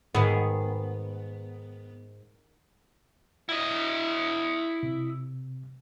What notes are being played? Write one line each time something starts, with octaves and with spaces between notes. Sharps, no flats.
G#2 D#3 B3 G#4
E4 D#5
C3